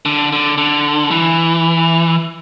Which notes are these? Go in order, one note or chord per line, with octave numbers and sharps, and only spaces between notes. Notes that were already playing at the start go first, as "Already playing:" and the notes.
D3
D3
D3
E3